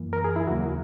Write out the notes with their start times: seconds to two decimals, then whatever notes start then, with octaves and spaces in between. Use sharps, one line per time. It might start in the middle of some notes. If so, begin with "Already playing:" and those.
Already playing: F#2 E3 A#3
0.13 A#4
0.24 G#4
0.36 E4
0.47 D#2 C#3 F#3 A#3 F#4